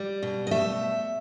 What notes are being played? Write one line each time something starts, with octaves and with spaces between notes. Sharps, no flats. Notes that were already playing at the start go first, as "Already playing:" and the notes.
Already playing: G3
B2
D#5
A3 E5